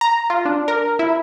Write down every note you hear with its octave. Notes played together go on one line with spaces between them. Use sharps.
A#5
F4
D4
A#4
E4